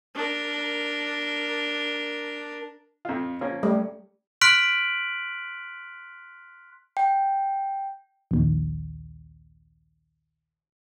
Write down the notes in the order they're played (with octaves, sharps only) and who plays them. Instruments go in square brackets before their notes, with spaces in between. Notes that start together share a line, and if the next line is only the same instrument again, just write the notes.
[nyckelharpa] D4 A#4
[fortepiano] F2 F4
F3 A#3 C#4
[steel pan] G3 A3
[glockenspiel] C6 F6 F#6 B6 D7 F#7
[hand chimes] G5
[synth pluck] A#1 D#2